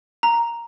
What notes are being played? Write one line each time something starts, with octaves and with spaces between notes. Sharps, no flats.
A#5